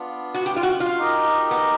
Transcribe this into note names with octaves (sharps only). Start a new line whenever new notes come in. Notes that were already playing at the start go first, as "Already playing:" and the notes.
Already playing: B3 D4 F4
F#4
G4
F4
F#4
F4
D#4 G4 A#4 D#5
B3